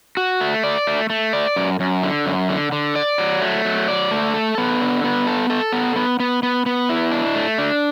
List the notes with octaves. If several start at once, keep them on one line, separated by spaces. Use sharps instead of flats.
F#4
A3
D5
A3
A3
D5
F#2
F#2
D3
F#2
D3
D3
D5
F#3
A3
F#3
D5
A3
A4
B3
D3
B3
A4
A4
B3
B3
B3
B3
B3
E4
D4
A3
D4